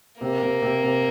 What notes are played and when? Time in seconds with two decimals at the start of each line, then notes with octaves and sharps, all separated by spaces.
0.21 C3 A#3
0.42 C3
0.62 C3
0.83 C3